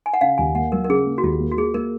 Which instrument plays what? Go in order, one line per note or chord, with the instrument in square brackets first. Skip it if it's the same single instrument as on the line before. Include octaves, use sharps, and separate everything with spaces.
[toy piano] G#5
F#5
[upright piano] C#3 [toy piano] F5
[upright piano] D#2 [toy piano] G#5
[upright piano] A#3 [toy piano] F#5
[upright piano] F#3 [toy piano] A#4
[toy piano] A#4
[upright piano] C#3 [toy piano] G#4
[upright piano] A#3
[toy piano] F#4
[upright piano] D#2 [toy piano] F4
[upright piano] A#3
[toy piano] F#4
[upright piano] A#3 [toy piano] G#4
[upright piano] A#3 [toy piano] A#4